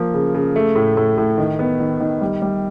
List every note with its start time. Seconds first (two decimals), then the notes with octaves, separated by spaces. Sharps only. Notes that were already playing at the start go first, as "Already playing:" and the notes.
Already playing: F3 A#3
0.14 C#3
0.34 C#3
0.56 A3
0.76 A2
0.97 A2
1.18 A2
1.38 D#3
1.59 B3
1.80 D#3
2.00 D#3
2.21 G3
2.42 G3